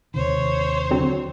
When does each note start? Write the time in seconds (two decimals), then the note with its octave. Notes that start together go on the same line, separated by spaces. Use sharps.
0.14 D#2 C3 D#3 C5 C#5
0.91 D3 F#3 C4